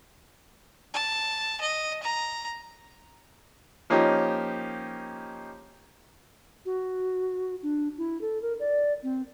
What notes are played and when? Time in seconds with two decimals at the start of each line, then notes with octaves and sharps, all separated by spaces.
0.93 A5
1.61 D#5
2.03 A#5
3.90 F3 A#3 C#4 D#4 G4
6.65 F#4
7.63 D4
7.98 E4
8.21 A4
8.42 A#4
8.60 D5
9.03 C4